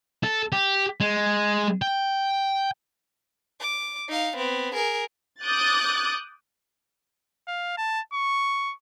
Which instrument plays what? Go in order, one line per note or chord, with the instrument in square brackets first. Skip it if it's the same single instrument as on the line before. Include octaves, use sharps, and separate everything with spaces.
[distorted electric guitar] A4
G4
G#3
G5
[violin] D6
D#4 F5
B3 C4
G#4 A#4
[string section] D6 D#6 F#6 G6 A6
[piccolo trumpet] F5
A5
C#6